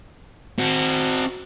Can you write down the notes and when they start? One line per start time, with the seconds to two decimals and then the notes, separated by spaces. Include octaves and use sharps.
0.59 C4 F#4